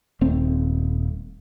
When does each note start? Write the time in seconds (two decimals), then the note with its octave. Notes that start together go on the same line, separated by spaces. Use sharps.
0.21 D#1 A3 C4